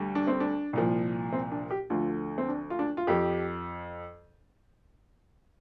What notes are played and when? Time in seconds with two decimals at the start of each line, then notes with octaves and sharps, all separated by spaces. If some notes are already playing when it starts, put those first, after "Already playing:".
Already playing: D2 D3 G3
0.15 D4
0.27 C4
0.40 D4
0.73 C2 A#2 F3
1.33 C4
1.52 D4
1.71 G4
1.90 D2 D3 F3 F4
2.38 C4
2.49 D4
2.70 F4
2.79 D4
2.97 F4
3.07 F2 F3 G4